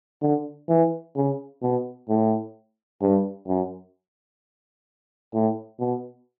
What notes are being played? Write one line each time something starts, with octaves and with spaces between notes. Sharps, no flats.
D3
E3
C#3
B2
A2
G2
F#2
A2
B2